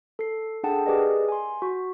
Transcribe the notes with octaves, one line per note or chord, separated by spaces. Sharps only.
A4 C7
D4 G#4 A4 F#5 G5 A5
G4 G#4 A#4 B4 D5 D#5
G#5 C6
F#4